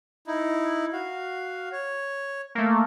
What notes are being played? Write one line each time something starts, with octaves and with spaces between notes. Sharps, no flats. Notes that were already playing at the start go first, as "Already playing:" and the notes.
D#4 E4
F#4 F5
C#5
A3 A#3